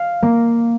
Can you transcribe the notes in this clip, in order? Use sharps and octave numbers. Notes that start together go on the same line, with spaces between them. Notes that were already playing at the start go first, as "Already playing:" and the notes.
Already playing: F5
A#3